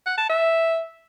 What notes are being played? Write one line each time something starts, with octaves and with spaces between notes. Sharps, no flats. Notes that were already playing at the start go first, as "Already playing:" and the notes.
F#5
A5
E5